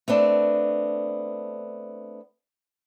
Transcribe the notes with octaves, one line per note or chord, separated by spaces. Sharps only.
A3 B3 C4 D4